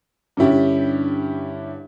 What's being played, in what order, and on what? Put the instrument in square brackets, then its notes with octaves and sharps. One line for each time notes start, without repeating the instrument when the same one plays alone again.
[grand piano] G2 D3 C#4 E4 G4